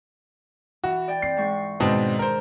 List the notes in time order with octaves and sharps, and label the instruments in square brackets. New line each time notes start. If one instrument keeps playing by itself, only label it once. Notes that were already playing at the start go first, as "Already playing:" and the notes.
[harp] E3 [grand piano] F#4
[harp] D5 G5
[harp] C4 [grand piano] C7
[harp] G#2 G#3 C#6
[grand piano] G#2 B2 C4 [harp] D#3 G#3 D4
[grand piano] A#4 C5